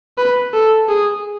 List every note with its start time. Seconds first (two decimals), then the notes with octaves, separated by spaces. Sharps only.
0.18 B4
0.53 A4
0.89 G#4